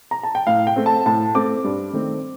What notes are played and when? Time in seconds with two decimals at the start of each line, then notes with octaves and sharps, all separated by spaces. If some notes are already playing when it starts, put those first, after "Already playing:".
0.11 A#5
0.23 A5
0.35 G5
0.47 A2 F5
0.67 G5
0.76 A3 C4
0.86 A5
1.06 A2 A5
1.35 A3 C4 D6
1.64 G2
1.93 D#3 A3 C4